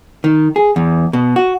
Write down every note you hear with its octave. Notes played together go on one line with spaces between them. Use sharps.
D#3
G#4
E2
B2
F#4